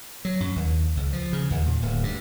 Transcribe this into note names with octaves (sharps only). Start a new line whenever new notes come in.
F#3
F#2
D#2
C#2
F3
C#3
D#2
A#2
D1
G2